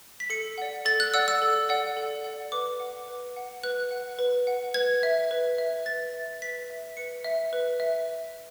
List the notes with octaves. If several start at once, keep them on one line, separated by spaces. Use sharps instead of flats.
B6
A4 C#7
D5 F#5
A4 A6
F#6
D5 F#5 E6
E6
A4
D5 F#5
A4
D5 F#5
B4 D6
F#5
B4
F#5
B4 F#6
F#5
B4
F#5
B4 G#6
E5
B4
E5
B4 A6
E5
B4 B6
E5
B4 C#7
E5
B4
E5